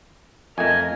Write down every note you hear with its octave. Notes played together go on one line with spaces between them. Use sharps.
F2 A3 A#4 D#5 G#5